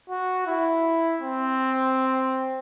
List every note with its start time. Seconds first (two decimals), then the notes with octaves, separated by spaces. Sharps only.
0.10 F#4
0.47 E4
1.22 C4